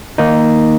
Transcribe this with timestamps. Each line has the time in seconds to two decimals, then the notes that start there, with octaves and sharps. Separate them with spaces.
0.18 D#3 A#3 D#4